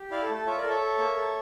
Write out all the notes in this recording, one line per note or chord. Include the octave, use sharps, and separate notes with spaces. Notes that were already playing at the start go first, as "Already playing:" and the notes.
Already playing: G4
E4 D5 F5
A4
A3
A4
F4 C#5 E5
A#4 D5
A4
C#5 E5
A4
A#3
A4